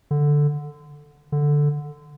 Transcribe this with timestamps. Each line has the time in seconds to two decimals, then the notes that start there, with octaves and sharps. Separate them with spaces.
0.11 D3
1.32 D3